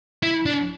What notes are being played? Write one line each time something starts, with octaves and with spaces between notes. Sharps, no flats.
E4
D4